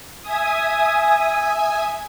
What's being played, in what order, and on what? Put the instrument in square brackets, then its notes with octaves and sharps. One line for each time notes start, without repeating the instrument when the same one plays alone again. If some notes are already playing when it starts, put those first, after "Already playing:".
[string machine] E5 G#5 D#6